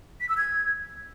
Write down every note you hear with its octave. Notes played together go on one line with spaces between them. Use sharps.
B6
E6
G#6